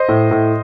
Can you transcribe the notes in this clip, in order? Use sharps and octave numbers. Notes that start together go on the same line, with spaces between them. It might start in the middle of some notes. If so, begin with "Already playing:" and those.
Already playing: C5 D#5
A2
A2